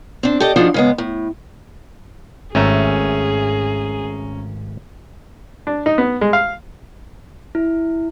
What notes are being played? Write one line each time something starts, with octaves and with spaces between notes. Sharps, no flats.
C4 D4
G4 A4 D5 D#5
F3 D4 D#4 F4 F#4 G#4
C#3 G#3 B3
A2
G#1 A3 C#4 G#4 E5 A#5
D4
D#4
B3
G#3
F5
E4